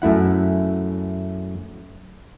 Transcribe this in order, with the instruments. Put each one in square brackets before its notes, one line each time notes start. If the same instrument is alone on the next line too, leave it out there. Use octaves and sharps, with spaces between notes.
[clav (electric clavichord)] F#2 A3 E4 F#5